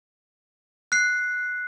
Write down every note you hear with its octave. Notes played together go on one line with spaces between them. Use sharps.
F#6 C7